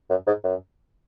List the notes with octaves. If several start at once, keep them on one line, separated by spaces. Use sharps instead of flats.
F#2
G#2
F#2